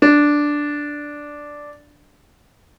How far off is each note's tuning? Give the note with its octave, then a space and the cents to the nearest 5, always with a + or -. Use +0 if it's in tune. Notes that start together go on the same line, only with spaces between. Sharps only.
D4 +0